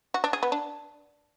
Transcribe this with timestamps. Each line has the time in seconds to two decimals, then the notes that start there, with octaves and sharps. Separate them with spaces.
0.14 F#4
0.24 D4
0.33 G#4
0.43 B3
0.52 D4